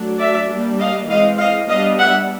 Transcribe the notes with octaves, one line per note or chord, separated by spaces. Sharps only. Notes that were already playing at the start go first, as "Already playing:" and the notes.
Already playing: F#3 A3 D4
D5 E5
G3 A#3 D4
D#5 F5
E3 G#3 C4 D#5 F5
D#5 F5
G3 B3 D4 D#5 F5
E5 F#5